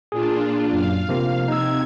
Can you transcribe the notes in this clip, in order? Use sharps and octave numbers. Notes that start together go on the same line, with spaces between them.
A#2 D4 F4 G#4
F#2 F5
C3 F3 A#3
C3 D#4 E6 G#6